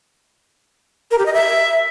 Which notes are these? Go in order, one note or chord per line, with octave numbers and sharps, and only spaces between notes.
A#4
G4
D#5
E5